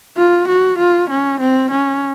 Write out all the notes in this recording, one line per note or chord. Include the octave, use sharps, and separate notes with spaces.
F4
F#4
F4
C#4
C4
C#4